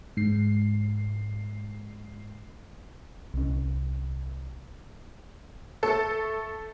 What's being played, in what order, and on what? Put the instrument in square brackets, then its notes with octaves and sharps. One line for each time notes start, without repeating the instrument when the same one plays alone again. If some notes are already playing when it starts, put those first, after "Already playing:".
[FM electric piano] G#2 C7
[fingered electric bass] C2 C#4
[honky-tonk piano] A3 A4 A5 C#7